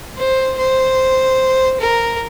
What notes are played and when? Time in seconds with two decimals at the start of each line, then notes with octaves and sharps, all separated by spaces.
0.17 C5
0.58 C5
1.81 A#4